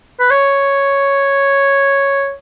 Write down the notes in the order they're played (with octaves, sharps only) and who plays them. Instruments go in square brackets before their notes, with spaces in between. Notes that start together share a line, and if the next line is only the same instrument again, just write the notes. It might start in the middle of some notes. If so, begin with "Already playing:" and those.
[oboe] B4
C#5